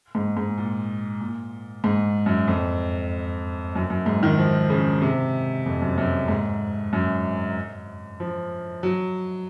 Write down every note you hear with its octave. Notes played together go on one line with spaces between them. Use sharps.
G#2
G#2
A#2
A#2
G#2
F#2
F2
F#2
F#2
G#2
D#3
F3
C#3
C3
F2
F#2
F#2
G#2
F#2
F3
F#3